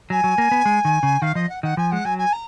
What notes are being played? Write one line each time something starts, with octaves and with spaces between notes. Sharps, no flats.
F#3 G#5
F#3
A#3
B3
G#3
D#3
C#3
D#3 F5
F3 D#5
F#5
D#3 F#5
F3 G#5
G#3 F#5
F#3 G#5
G#5
A#5